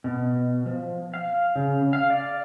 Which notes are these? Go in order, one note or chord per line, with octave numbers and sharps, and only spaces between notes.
B2
F3
F5
C#3
F5
D5